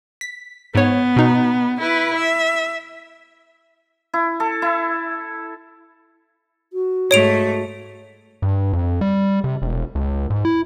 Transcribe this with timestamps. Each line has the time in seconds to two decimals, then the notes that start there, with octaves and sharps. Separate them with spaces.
0.21 B6
0.75 G#2 B3 C#5
1.16 B2 D#4
1.81 E4 B4
2.16 E5
4.14 E4
4.40 A4
4.62 E4
6.73 F#4
7.11 G#2 A3 C#5 D7 F7
8.42 G2
8.73 F2
9.01 G3
9.44 C3
9.62 E1
9.95 C#2
10.30 G#2
10.45 E4